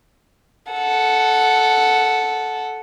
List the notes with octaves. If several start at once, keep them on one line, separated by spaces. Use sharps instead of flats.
A4 F#5